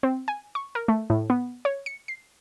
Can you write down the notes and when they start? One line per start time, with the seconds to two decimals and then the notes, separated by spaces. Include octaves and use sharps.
0.03 C4
0.28 G#5
0.55 C#6
0.75 A#4
0.88 A3
1.10 A2
1.30 B3
1.65 C#5
1.86 C#7
2.08 C7